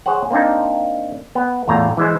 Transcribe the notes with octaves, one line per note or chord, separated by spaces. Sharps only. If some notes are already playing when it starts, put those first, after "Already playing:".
G#4 C5 C#5 F#5
A#3 C4 D4 D#4
B3
E2 A2 F4 A#5
E3 G#3 C5